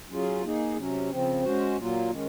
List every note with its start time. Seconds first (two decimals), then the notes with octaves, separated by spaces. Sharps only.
0.10 F#3 C#4 F4 G#4
0.43 A#3 D#4 G#4
0.76 C3 F#3 C#4
1.10 C#3 F3 C4
1.44 G#3 C#4 F#4 C5
1.77 A#2 F#3 A#3 F4
2.10 D#3 G#3 C#4